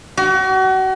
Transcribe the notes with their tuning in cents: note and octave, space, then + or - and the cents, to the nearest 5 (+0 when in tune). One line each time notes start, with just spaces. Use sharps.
F#4 +35